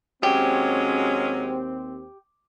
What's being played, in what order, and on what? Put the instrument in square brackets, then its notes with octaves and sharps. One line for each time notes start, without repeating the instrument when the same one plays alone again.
[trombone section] D#2 C4 [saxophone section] F#3 G#3 C#4 [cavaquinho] G4